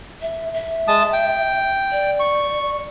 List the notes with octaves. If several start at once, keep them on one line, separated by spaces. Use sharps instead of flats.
E5
E5
G#3 A5 D#6
G5
D5
C#6